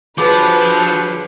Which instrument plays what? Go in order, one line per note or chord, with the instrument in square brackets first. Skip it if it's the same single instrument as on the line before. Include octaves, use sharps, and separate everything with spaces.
[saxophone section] G2 D3 F#3 [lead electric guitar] F3 [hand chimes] G#4 D6 [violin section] B4